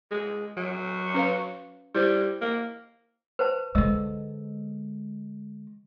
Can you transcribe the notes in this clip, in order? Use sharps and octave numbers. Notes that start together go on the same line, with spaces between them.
G#3
F#3
C#4 B4 F5
G3 E4 C5
A#3
B4 C5 A5
D3 G#3 D#5 E6